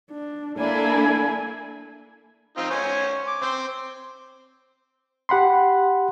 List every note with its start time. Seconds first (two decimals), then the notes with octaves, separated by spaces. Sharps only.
0.11 D4
0.59 A#3 D4 E4 A4 G#5
2.57 C4 D#4 F4
2.70 C5 C#5 G#5
3.27 D6
3.42 C4 C5
5.29 G4 F#5 B5 C6